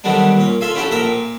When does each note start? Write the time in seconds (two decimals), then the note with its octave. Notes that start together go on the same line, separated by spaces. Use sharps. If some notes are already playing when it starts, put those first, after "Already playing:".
0.04 D3 D#3 F#3 G3 B3 D4
0.37 A#2 C#4
0.61 F4 A4 E5 F5 G#5
0.75 C#4 D4 E4 F#4 G4 A4
0.91 A#1 A4 A#4 E5 A#5
1.05 A#2